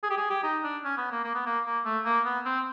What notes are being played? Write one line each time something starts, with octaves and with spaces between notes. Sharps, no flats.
G#4
G4
G#4
G4
D#4
D4
C#4
B3
A#3
A#3
B3
A#3
A#3
A3
A#3
B3
C4